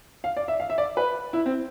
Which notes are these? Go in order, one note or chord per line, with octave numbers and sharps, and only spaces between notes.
F5
D5
E5
F5
E5
D5
B4
E4
C4